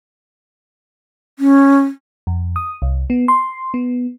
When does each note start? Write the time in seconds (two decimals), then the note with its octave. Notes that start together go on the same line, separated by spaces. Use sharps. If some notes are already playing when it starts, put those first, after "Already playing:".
1.39 C#4
2.27 F2
2.56 D#6
2.82 C2
3.10 B3
3.28 C6
3.74 B3